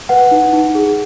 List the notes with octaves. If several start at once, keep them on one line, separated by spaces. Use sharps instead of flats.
B4 F#5
D#4
D#4
G#4